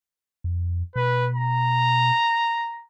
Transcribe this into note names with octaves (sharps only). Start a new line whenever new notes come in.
F2
B2 B4
A#5